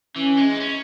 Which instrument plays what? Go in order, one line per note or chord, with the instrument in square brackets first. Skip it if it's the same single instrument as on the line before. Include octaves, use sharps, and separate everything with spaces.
[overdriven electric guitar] E3 [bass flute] C#4
[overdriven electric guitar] G#3
D#4
C#4